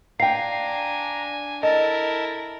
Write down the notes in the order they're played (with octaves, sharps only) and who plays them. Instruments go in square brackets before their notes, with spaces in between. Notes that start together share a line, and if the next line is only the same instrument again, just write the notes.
[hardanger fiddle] D4 G#5 [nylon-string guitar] F5 G5 [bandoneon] A#5 [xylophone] C7
[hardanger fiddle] E4 A#4 [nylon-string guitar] A4 [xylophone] D#5 [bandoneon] A5